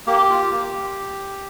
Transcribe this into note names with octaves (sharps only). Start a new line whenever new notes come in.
A#3 G4
F4
A#3